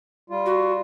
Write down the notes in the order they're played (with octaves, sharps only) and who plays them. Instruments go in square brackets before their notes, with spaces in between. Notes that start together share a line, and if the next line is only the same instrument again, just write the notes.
[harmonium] G3 F4
[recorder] F#4